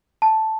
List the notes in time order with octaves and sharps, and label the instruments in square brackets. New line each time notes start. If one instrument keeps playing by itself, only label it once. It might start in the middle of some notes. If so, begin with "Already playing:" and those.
[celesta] A5